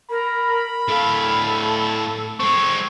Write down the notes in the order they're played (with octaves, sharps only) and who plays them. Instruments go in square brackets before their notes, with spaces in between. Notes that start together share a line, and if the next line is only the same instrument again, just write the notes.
[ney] A#4 [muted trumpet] B5
[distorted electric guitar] A2 F5 [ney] A4
[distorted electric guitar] G#3 C4 [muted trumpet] C#6